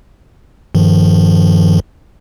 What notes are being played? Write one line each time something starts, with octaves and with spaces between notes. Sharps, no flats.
G2 D#3 F3